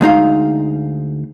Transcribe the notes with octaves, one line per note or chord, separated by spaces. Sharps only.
D2 G#3 D#4 F5